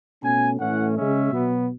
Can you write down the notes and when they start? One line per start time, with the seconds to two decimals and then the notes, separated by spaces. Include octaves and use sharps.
0.23 B2 A3 C#4 G#5
0.59 A2 E3 A3 C#4 F#5
0.96 C#3 G#3 C#4 E5
1.33 B2 F#3 B3